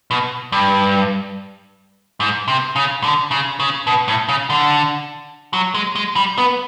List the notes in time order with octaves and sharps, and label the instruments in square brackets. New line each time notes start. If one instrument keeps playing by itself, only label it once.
[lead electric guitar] B2
G2
G#2
C3
C#3
D3
C#3
C#3
B2
A2
C#3
D3
F#3
G#3
G#3
G3
B3